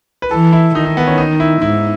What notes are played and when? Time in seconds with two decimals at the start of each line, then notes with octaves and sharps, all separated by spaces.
0.22 B4
0.31 E3 A4
0.53 E4
0.75 D#3 D#4
0.85 D#4
0.97 B3
1.07 C#4
1.18 D#4
1.40 E4
1.62 G#2 E4